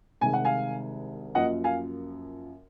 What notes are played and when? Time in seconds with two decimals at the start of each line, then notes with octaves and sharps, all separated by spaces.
0.21 C2 C3 D#3 G#3 G#5
0.33 F#5
0.45 F5 G#5
1.35 F#2 F3 A#3 D#5 F#5
1.64 F5 G#5